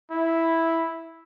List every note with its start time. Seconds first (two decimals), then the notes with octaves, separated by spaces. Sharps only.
0.11 E4